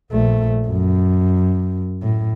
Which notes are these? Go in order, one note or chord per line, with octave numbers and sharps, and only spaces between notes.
A#1 A3
F#2
A2